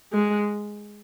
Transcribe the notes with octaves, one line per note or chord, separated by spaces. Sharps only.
G#3